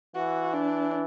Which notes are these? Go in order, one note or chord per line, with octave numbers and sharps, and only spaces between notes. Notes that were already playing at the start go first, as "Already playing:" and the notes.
E3 F#4
D4